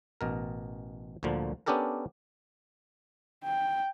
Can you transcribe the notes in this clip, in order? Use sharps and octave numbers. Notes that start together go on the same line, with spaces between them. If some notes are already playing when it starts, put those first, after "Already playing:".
A1 B2 A#4
D2 A#2 D3 F3 A#3
B3 C#4 D4 G4 A4 A#4
G5